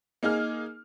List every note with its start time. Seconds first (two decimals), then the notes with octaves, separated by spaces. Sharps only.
0.23 A#3 D#4 G#4 F6